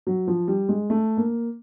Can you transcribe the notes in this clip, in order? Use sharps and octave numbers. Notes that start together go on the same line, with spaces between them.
F#3
F3
G3
G#3
A3
A#3